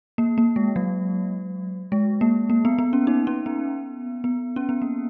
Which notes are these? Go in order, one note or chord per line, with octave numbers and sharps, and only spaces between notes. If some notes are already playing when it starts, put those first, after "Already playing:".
A#3
A#3
G#3
F#3
G#3
A#3
A#3
B3
B3
C#4
D#4
C#4
B3
B3
C#4
B3
A#3